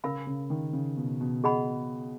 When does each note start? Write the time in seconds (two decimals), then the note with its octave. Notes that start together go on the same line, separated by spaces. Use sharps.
0.04 C#3 A#4 F5 B5
0.27 C#3
0.50 D#3
0.73 C#3
0.97 B2
1.21 B2
1.44 G#4 D#5 F#5 B5